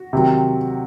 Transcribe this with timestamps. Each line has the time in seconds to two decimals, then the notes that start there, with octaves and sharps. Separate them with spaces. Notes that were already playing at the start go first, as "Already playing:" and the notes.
Already playing: F#4
0.13 C3 D#3 F#3